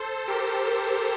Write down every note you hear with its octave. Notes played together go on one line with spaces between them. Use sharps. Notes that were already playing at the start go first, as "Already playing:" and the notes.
Already playing: A4 C5
G4 A#4